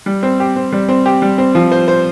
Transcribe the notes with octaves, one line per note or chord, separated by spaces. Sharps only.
G3
C4
G4
C4
G3
C4
G4
G3
C4
F3
C5
C5